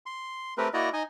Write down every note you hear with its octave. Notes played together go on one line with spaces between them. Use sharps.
C6
A3 C4 G4 A#4 B4
A#3 E4 F#4 D5 D#5 A#5
D#4 D#5 G#5